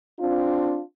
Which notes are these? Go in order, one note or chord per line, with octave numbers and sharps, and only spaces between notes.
C4 D4 F4